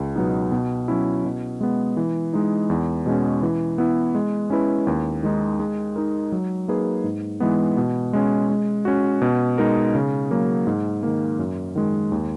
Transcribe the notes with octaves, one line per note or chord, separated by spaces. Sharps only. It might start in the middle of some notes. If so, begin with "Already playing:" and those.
Already playing: C#2
B2 F#3 B3 D#4
B2
F#3 C#4 E4
B2
G#3 B3
E3
G#3 D#4
E2
B2 G#3 C#4
E3
B3 E4
G#3
C#4 E4 B4
D#2
D#3 G#3 D#4
G#3
D#4 A#4
F#3
A#3 D#4 G#4 B4
G#2
E3 G#3 B3
B2
G#3 C#4
G#3
C#4 F#4
B2
G#3 D#4 A#4
C#3
F#3 A#3
G#2
D#3 A#3
F#2
D#3 G#3
D#2